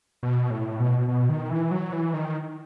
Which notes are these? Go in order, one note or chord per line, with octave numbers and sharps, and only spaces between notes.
B2
A2
B2
B2
D#3
E3
F#3
E3
D#3